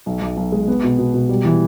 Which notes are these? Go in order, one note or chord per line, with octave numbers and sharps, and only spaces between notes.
B1
B1
B1
G#3
B3
B2
B2
B2
G3
E3